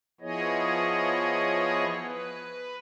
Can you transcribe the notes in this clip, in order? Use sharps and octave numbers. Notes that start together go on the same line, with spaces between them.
F3 B3 E4 G#4 C#5 D#5
B4